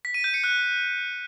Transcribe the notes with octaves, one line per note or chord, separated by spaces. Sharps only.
B6
D#7
G6
C#7
F#6